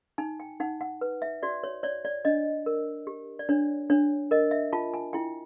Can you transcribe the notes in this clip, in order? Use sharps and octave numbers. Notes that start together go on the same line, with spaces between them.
D#4 G#5
G5
D#4 F#5
F#5
B4
E5
F#4 D5
C#5
C#5 D5
D5
D4 D#5
A#4
G4
D5
D4 C#5
D4 C#5
A#4 D#5
E5
F4 A5
G#5
E4 G5